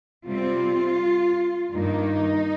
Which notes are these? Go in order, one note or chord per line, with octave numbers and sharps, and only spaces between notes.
C3 G3 C4 F4
G2 D#3 A#3 D#4